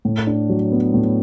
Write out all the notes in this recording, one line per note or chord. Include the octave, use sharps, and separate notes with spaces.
A2
D4
F#3
B3
A2